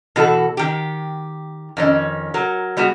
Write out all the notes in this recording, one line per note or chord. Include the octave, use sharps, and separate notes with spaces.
B2 E3 F#4 A4
D#3 G4
F2 D#3 C#4
F#3 A#4
G3 B3 F#4 G#4